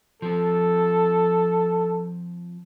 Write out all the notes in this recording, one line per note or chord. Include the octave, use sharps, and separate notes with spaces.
F3 C4 A4